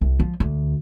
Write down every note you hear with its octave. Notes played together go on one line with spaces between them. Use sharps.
C2
F3
D2